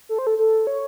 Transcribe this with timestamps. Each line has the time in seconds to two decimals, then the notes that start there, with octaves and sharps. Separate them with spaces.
0.09 A4
0.18 C5
0.27 A4
0.38 A4
0.67 C#5